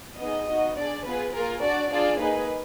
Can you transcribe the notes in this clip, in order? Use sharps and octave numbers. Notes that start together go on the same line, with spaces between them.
B3 D#4 G#4 D#5
B3 D#4 F#4
D4 G#4 D5
B3 F4 G#4 B4
A#3 F4 G#4 A#4
D4 F#4 D5
D4 F4 G#4 D5
A#3 D#4 G#4 B4